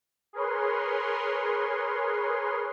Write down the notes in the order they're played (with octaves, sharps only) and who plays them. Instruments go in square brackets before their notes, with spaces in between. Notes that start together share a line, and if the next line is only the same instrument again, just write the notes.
[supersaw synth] G#4 A#4 B4 C#5 C6